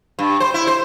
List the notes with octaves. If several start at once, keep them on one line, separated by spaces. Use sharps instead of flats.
G2
C5
E4
C5